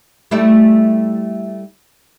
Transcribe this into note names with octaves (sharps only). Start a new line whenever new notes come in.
G3 A3 E4